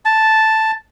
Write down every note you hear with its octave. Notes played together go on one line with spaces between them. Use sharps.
A5